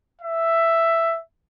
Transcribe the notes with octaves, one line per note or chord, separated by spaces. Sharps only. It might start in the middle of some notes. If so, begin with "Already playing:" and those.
E5